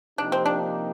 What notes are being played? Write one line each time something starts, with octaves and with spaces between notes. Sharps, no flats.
C3 F3 A#3 D4 D#4 G4
C4
D4